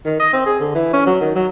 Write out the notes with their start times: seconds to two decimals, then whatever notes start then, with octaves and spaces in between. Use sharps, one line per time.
0.06 D#3
0.20 D#5
0.33 C4
0.46 G#4
0.60 D3
0.75 E3
0.93 C#4
1.06 F#3
1.21 D#3
1.36 F#3